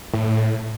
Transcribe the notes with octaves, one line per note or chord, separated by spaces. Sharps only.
A2